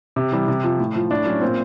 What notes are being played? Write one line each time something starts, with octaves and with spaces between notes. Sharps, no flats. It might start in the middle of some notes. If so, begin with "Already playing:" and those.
C3
E3 G3
C3
F3
A2
F3
A2 D4
F#3 C#4
A#2 C4